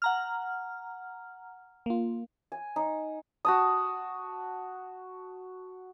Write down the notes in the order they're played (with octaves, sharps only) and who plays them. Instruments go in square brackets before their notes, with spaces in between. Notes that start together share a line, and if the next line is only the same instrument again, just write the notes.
[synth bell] F#5 A#5 F6
[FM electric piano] A#3 F4
[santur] G#5
D#4
F#4 A5 D#6